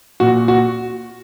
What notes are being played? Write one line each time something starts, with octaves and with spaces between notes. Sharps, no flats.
A#2 F#4
F#4